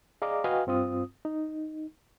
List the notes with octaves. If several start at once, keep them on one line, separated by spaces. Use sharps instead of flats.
G#4 D5 D#5 F5 A#5 D6
F#4 B4 D#5 F5 G5 G#5
G2 C4 F4 D#6
D#4